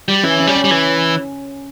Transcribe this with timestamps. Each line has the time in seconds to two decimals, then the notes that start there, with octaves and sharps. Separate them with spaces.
0.08 G3
0.24 E3 C#4
0.40 C#4
0.47 G3
0.56 C#4
0.64 G3
0.71 E3